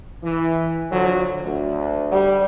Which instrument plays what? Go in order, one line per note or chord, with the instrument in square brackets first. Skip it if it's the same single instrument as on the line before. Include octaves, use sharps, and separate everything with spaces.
[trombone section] E3
D3 F3 F#3
D2
[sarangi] G3